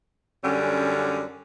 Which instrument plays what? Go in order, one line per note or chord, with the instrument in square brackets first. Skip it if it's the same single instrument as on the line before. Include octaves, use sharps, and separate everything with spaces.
[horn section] F#2 D3 G3 C#4